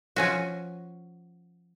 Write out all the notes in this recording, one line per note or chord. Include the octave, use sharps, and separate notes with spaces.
F3 C#4 F#4